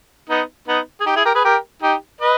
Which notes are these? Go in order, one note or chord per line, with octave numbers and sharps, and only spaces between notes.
B3 D#4
B3 D#4
G#4
D#4 G4
E4 G#4
G4 A#4
G#4 B4
G4 A#4
D#4 G4
B4 D#5